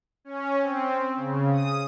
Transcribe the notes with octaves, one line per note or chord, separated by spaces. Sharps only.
C#4
C4
C#3
D#6